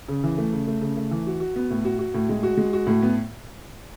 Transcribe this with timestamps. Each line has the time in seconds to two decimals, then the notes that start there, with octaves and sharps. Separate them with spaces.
0.08 C#3
0.24 E3
0.38 A3
0.53 C#3
0.67 A3
0.81 C#3
0.97 A3
1.11 E3
1.26 F#4
1.40 F#4
1.56 B3
1.70 A2
1.85 F#4
1.99 F#4
2.14 A2
2.29 G#3
2.43 F#4
2.57 G#3
2.73 F#4
2.87 A2
3.02 B3